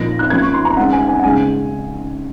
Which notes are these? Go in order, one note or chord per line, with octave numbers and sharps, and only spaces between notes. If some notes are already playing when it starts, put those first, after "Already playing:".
Already playing: A#2 F3 A#3 D#4 A#6
F#6
F3 A#3 C#4 G#6
C#6
C6
A#5
D#3 G#3 C#4 F#5
G#5
G#5
F#5
C#3 G#3 D#4 G#5